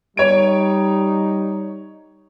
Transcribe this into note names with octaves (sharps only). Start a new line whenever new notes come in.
G3 D#4 C#5 G#6 D7